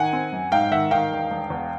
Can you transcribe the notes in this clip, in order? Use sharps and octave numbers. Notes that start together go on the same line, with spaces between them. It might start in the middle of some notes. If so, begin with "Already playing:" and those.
Already playing: D#3 F#5 G#5
C4
F#2
G#2 F5 G5
D#3 E5 F#5
D#3 F5 G5
E1
E1
E2